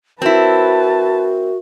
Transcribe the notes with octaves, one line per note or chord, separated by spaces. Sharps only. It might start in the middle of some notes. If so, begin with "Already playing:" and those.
C4 E4 F#4 A#4 B4 E5 A5